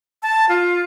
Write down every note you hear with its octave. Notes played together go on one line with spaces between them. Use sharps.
A5
F4